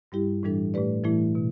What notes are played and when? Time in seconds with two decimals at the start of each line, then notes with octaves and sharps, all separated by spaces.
0.12 G2 G3 E4 G4
0.43 A2 E3 G3 D4 A4
0.74 A2 A3 G4 B4 D5
1.04 A2 E3 A3 E4
1.35 B2